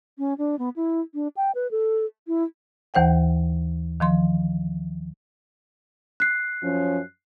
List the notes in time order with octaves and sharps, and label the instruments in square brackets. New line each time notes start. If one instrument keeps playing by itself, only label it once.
[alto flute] C#4
D4
B3
E4
D4
G5
B4
A4
E4
[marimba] D#2 E3 C5 F#5 G5
D#3 F3 C6
[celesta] F#6 C7
[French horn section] F#2 F3 C#4